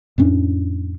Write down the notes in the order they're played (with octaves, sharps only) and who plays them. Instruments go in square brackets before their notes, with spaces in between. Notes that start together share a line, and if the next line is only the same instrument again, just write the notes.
[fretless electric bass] F2 A2 C#4 D4